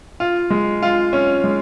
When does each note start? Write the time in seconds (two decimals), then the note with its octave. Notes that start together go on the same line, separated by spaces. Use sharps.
0.20 F4
0.50 G#3
0.83 F4
1.13 C#4
1.44 G#3